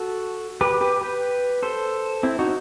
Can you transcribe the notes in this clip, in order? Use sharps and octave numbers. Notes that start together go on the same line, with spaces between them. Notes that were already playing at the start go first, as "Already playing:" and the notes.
Already playing: F#4 A4
G4 B4
G4 B4
G4 B4
A4 C5
C4 E4
D#4 F#4